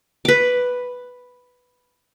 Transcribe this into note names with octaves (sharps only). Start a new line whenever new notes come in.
B4 D6